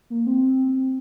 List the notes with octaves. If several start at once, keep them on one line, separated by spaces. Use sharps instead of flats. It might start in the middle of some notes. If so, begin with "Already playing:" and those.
A#3
C4